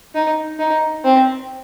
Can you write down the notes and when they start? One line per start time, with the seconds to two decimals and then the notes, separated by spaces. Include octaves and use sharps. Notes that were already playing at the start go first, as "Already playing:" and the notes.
0.15 D#4
0.59 D#4
1.04 C4